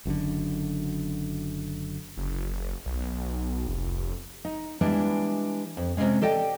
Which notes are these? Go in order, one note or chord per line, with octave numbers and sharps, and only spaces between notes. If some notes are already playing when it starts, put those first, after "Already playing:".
F#1 F#2 A#2 D3
F#1
B1
F1
D#4
E3 G3 G#3 B3 D4 E4
F2
C3 E3 G3 G#3 C#4
G4 A4 D5 D#5 G5